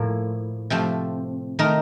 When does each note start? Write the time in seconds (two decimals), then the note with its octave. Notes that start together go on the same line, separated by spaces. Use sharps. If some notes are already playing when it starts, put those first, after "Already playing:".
Already playing: A2 F3 A#3
0.70 C3 F3 A3 C4
1.59 D#3 A3 D#4 A#4